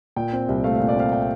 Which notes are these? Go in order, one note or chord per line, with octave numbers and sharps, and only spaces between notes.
A#2 G5
C4
C2
A3 F5
F5
A#2
D5
C4 F5
G5